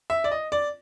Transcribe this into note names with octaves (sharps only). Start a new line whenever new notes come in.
E5
D5
D#5
D5